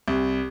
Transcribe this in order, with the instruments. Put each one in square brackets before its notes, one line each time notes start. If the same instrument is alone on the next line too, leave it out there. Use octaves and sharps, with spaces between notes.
[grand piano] C2